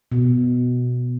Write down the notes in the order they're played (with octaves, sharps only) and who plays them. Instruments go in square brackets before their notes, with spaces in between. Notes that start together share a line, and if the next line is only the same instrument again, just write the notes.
[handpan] B2